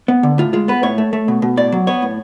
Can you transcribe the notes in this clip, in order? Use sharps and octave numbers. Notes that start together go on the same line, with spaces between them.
B3
D3
A2 F4
G#3 F4
B3 B4
A2 C#5
A3
A3
B2
B2
A2 D5
F#3
B3 C#5
A2